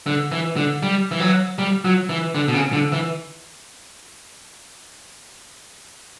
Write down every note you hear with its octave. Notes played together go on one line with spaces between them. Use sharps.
D3
E3
D3
G3
E3
F#3
G3
F#3
E3
D3
B2
C#3
D3
E3